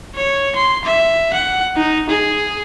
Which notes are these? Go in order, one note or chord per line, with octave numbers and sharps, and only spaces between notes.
C#5
C6
E5
F#5
D#4
G#4